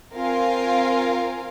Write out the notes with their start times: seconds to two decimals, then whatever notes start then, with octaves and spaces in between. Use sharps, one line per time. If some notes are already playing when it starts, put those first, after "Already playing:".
0.14 C4 F4 A#4 F5 G#5